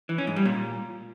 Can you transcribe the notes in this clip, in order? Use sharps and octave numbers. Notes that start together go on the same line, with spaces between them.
E3
C#4
G#2
G3
A#2